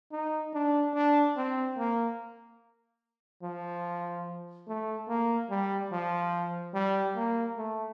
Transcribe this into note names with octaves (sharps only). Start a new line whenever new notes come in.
D#4
D4
D4
C4
A#3
F3
A3
A#3
G3
F3
G3
A#3
A3